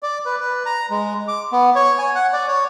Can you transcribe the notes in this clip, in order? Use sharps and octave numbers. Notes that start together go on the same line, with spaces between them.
D5
B4
B4
A#5
G#3
D6
B3
C#5
G#5
F#5
D5
C#5